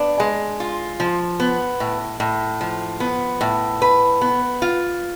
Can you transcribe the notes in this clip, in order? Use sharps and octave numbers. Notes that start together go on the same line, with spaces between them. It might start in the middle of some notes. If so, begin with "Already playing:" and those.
Already playing: B3 D4
G#3
F4
F3
B3
A2
A2
F3
B3
A2
B4
B3
F4